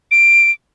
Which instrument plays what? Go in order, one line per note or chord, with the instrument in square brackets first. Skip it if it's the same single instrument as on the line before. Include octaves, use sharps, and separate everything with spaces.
[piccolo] D7